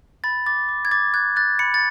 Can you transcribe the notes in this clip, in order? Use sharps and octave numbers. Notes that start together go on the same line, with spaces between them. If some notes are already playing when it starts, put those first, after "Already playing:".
B5 A6
D6 A6
D6
G#6
D6 A6
F#6 G#6
F#6 A6
B5 C#7
A6